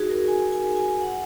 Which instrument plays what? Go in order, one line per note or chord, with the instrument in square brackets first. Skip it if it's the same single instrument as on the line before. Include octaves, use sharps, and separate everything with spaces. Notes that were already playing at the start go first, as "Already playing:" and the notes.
Already playing: [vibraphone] D#4 F#4 G#4
A#4
G#5
G#5
G#5
F#5